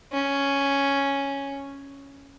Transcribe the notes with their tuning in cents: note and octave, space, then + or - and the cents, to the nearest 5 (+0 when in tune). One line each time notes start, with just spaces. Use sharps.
C#4 +0